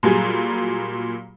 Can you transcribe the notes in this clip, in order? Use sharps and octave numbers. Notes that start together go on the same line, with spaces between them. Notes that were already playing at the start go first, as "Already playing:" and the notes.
A#2 F#3 G3 G#4